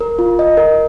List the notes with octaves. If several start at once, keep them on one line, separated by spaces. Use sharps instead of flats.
A#4
F4
D#5
A#4